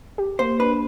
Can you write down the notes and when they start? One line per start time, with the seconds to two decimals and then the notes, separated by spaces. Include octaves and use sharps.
0.18 G4
0.39 A#3 C5
0.60 D4 B4